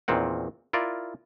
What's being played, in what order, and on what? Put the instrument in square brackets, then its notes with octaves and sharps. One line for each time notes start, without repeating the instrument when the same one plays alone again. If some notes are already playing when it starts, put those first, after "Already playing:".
[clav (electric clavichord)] E2 A#2 D#3 C4 F#5
E4 F4 A#4 D5